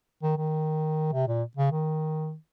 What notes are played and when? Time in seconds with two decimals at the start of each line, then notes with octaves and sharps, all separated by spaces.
0.23 D#3
0.37 D#3
1.13 C3
1.27 A#2
1.57 C#3
1.71 D#3